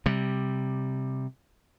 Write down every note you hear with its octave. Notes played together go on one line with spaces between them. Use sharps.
C3 G3